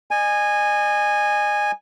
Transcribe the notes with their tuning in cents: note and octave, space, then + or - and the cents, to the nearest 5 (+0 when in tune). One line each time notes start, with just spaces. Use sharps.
D#5 -40 G#5 -10